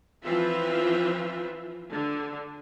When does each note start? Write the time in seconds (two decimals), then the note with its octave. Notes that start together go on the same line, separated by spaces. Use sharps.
0.24 E3 F3 C4 F4 B4 E5
1.91 D3